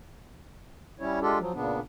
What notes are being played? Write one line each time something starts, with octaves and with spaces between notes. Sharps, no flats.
G3 C#4 E4 C#5
G#3 D4 F4 G4 A4
F3 F#3
A#2 C#3 B3 D4